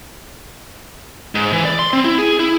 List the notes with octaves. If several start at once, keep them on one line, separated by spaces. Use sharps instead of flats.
G#2
E3
D5
C6
C4
E4
G#4
E4